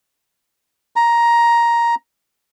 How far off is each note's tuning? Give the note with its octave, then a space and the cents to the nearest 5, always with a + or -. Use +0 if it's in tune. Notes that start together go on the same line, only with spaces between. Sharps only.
A#5 +10